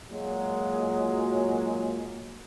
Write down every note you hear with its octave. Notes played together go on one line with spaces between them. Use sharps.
A#2 F#3 G#3 A#3